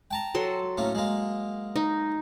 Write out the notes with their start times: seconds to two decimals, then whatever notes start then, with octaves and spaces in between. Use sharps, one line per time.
0.11 G5 A5 A#5
0.35 F#3 A4 C6
0.77 A2 A#3 C#4
0.95 G#3 A#3
1.76 D#4